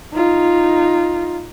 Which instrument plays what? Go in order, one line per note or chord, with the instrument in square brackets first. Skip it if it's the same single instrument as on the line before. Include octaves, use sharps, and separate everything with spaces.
[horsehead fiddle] D#4 F4